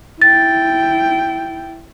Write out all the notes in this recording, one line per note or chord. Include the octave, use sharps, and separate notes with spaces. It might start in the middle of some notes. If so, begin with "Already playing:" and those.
E4 G5 A6